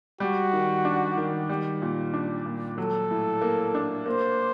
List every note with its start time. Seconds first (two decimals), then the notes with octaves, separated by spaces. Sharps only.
0.20 G3 F#4
0.53 D#3
0.85 D4
1.17 D#3
1.49 G3
1.82 A#2
2.14 D4
2.46 A#2
2.78 F#3 A4
3.11 A2
3.41 A#3
3.75 D4
4.06 A#3 C5